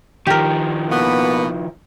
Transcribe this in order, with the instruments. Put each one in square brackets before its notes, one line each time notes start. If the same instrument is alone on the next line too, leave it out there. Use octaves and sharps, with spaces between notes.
[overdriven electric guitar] D#3 F3 [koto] G4 A#4
[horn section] B2 A#3 B3